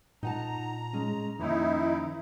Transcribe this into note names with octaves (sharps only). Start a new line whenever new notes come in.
A#2 D#4 F#5 A5 A#5
G#3 C#4
F2 D#3 A#3 C#4 D#4 E4